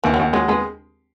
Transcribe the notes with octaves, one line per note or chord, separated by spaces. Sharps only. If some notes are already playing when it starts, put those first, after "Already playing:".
D#2 E3
F#3
D#2
F#3 G#3
G#3 B3